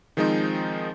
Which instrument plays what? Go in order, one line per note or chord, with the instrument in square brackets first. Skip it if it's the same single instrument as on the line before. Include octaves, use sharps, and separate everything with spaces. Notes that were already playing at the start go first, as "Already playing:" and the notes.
[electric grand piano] D#3 F3 G#3 C4 D#4